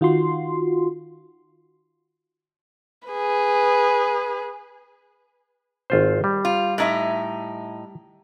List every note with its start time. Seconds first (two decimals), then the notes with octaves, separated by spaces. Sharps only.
0.01 D#3 F4 F#4 C6
3.09 G#4 B4
5.90 G#1 F4 C5
6.24 G3
6.45 F4
6.78 A2 D#4 E5